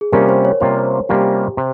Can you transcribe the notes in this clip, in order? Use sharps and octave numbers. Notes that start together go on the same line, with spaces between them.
G#4
C3 G3 A#3 C#4 F4 A#4
C5
C#5
C3 G3 A#3 C#4 F4 C5
C3 G3 A#3 C#4 F4 G4
C3